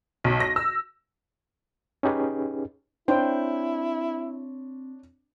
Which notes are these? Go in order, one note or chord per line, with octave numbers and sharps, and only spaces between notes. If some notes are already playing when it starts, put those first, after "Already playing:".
B1
A#6
E6
C#4 D#4 G4 G#4 B4
C4 D4 E4 C5 C#5 G5